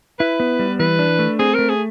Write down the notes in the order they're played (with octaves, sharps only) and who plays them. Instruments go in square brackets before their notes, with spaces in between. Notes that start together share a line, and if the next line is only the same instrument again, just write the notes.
[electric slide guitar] E4 [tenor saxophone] B4
[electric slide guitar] B3
G3
[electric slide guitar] E3 [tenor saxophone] B4
[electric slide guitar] D4
A3
[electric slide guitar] C4 [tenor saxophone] G#4
[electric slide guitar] A3 [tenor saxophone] A#4
[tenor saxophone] G#4